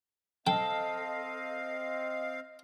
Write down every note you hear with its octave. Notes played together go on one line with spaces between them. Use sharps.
C4 A4 D#5 F5 G5